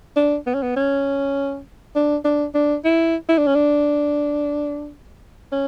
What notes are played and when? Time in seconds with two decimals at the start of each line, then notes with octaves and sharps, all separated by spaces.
0.16 D4
0.47 B3
0.54 C#4
0.63 B3
0.76 C#4
1.96 D4
2.25 D4
2.55 D4
2.85 E4
3.29 E4
3.38 D4
3.47 C#4
3.55 D4
5.52 C#4